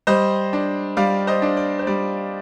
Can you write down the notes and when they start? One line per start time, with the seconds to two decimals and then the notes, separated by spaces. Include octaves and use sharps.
0.07 G3 C5 D#5
0.53 D4
0.97 G3 D5 F5
1.27 C5 D#5
1.42 D4
1.57 D5
1.79 C5
1.87 G3 D5